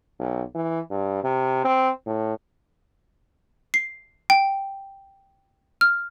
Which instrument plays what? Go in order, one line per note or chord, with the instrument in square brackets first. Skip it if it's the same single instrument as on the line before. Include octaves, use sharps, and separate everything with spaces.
[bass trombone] B1
E3
G2
C3
C4
A2
[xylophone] C7
G5
F6